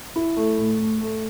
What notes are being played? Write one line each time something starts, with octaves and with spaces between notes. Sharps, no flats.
E4
A3
A2
A2
A3